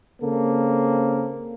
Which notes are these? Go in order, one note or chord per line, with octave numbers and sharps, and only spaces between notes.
C#3 A#3 C4 A4